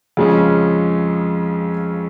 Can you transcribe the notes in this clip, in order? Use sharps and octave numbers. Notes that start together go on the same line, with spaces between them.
F2 C#3 F3 G#3 C#4